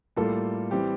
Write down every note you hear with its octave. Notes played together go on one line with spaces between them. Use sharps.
A2 G3 A#3 F4 A4
E3 G3 C4 G4